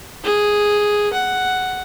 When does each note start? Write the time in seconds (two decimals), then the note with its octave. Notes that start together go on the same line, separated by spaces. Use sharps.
0.24 G#4
1.13 F#5